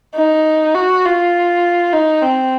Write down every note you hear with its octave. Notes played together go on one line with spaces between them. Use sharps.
D#4
F#4
F4
D#4
C4